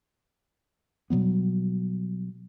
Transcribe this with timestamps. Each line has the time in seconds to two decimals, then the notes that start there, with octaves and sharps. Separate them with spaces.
1.10 B2 F#3 G3 B3